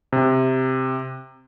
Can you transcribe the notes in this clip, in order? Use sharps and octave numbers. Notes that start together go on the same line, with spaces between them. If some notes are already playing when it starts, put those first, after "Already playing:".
C3